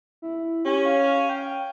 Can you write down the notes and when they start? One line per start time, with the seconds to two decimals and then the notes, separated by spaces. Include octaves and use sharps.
0.22 E4
0.65 C#4 G4
0.85 F5
1.29 G5